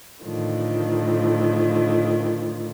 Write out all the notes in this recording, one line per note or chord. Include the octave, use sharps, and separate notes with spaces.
A2 D3 D#3 F3